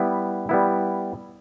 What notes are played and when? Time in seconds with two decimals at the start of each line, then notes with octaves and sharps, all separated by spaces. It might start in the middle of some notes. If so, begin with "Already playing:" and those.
Already playing: G3 B3 E4
0.49 G3 B3 E4